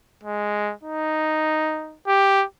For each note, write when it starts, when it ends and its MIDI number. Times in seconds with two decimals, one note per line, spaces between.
0.24 0.73 56
0.83 1.98 63
2.07 2.44 67